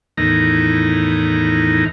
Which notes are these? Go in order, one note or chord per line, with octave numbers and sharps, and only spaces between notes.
E2 A2 D#3 D#4 A#5